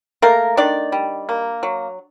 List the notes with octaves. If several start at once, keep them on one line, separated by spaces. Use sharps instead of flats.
A3 A#3 A#4
D#3 D4 D5
G3
A#3
F#3